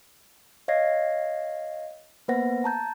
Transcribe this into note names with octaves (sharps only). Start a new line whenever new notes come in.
C#5 D#5 F5 G#6 A#6 C7
A#3 B3 B4 C5 F#5 A#6
A5 A#5 G6 A6